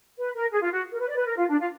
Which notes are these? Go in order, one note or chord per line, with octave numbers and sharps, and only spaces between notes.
B4
A#4
G#4
F4
F#4
A#4
B4
D5
B4
A#4
F4
D4
F4